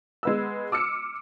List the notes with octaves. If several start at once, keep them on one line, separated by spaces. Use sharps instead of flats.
G#3 B3 E6
D6 E6 F6 C#7